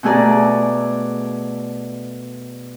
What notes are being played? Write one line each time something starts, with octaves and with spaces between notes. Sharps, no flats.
B2 A3 G#4 D5 A#5